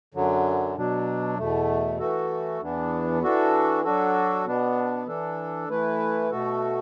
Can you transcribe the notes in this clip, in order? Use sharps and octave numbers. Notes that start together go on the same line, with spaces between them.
F#2 D3 F#3
B2 F#3 D4
E2 B2 A3
E3 A3 F#4 A4
E2 E3 B3 D4
E3 D4 F#4 A4
F#3 D4 F#4 A4
B2 B3 D4
E3 D4 A4
E3 A3 E4 B4
B2 A3 F#4 A4